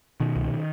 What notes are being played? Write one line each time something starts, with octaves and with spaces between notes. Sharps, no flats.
B2 D#3
C2